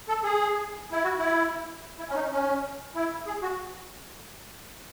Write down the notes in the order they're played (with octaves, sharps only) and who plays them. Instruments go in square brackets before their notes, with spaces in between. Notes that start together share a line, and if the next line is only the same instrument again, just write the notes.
[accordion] A4
G#4
E4
F#4
E4
E4
C#4
D#4
C#4
E4
G#4
F#4